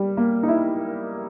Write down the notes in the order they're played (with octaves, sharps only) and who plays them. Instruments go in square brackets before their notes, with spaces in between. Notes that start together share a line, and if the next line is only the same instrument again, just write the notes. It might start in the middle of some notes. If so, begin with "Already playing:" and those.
Already playing: [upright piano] G3
A#3
D#4
E4